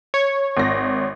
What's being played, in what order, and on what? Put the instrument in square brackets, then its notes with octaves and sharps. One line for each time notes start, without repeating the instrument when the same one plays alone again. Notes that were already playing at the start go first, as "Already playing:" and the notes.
[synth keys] C#5
[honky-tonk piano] G#1 A#6